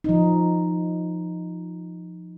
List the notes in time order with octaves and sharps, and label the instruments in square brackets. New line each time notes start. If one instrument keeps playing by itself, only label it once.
[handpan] F3 D#4